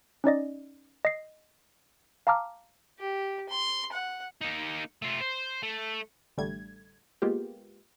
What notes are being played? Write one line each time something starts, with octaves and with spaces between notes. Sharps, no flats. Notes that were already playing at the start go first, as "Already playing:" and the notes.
C#4 D#4 D5 D#5
D#5 C7
F5 A5 A#5 D6 F6
G4
C6
F#5
A#3 D#4
A3 F4
C5
A3
A1 D3 G3 A3 G#6
G#3 A#3 B3 F4 G4